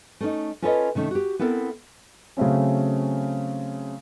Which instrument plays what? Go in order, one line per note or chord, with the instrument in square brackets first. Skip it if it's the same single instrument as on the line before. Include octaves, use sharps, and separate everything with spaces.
[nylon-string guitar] A3 C#4 D#4
C#4 F4 A4 B4 C#5 D#5
C3 D#3 A3 C#4
F#4 G4
B3 C4 E4 A4 A#4
[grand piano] C#3 F#3 A3 C4 C#4